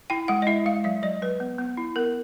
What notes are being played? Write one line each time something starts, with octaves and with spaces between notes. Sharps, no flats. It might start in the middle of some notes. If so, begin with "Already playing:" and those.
E4 G5
G#3 F#5
D#5
E4 E5
G#3 F5
F#3 E5
F#3 D#5
F#3 B4
B3
B3
E4
B3 A#4